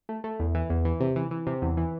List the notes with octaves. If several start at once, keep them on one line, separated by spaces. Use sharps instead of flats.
A3
A3
E2
E3
E2
E3
C3
E3
E3
C3
E2
E3